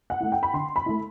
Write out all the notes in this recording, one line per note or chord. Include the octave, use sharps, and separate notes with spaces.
F#5
A3 E4
G5
B5
D3 C6
B5
A3 E4